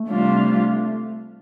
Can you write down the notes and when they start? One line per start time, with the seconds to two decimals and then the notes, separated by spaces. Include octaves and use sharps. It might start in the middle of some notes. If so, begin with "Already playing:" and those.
Already playing: A3
0.09 C3 G3 D4 F4